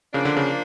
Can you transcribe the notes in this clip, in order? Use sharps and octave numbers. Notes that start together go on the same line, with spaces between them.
C#3 F3 A#3 D4
D3
C#3